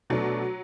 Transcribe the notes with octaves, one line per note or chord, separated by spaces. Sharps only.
B2 F#3 A3 D4